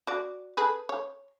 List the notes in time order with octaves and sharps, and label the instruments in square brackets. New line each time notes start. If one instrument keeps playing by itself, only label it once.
[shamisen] F#4 D5
G#4 A4 B4
C#5